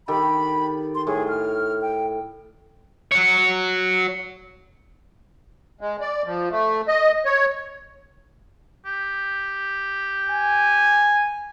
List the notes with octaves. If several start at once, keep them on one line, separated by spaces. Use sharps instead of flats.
D#3 G4 A4 B5
C6
A2 G#4
F6
G5
F#4 C#5
G#3
D5
F3
A3
D#5
C#5
G4
G#5